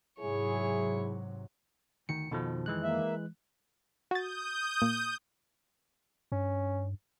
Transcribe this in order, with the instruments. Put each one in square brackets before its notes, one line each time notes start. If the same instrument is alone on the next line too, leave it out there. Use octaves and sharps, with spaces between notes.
[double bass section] G#2 C3 F#3 [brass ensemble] E4 G#4 [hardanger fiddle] C#5
[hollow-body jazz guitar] D2 D#3 [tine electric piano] C#7
[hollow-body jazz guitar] F2 D#3 A4 [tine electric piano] B2 F3
[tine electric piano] E3 G#3 F#6
[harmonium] A#3 E5
[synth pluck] F#4 A6 [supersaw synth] D#6 G6
[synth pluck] A#2
[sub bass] G2 [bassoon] C#4